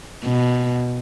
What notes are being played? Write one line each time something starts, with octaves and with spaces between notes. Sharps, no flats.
B2